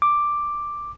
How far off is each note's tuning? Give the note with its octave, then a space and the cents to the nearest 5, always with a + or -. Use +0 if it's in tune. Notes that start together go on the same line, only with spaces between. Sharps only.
D6 +5